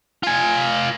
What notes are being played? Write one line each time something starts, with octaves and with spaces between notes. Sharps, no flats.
F4 G#5